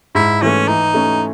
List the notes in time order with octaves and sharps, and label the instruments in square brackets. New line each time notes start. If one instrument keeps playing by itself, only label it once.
[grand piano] G#2 [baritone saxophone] E4
[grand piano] E3 A3 [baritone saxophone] C#4
[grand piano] E3 [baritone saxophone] D#4
[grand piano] A3 C#4